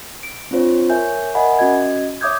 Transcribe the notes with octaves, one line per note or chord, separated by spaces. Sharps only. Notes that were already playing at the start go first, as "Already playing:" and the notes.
D7
C4 D4 F4 C5 C#5
A#4 C#5 E5 G#5 G6
A#4 D#5 E5 F#5 G#5 B5
C#4 F#4 D#5 G#6
C#5 E5 D6 D#6 G6 G#6